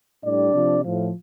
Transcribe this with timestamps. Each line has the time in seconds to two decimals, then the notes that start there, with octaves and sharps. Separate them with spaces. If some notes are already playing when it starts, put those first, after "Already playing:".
0.24 A2 G3 D4 D5
0.54 C3 F3
0.83 A2 F3